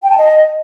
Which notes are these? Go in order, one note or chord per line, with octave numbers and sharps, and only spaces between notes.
G5
A5
D#5